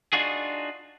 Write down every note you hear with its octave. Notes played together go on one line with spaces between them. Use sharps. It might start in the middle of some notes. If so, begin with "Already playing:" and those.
D4 D#4 F4 F#4 G#4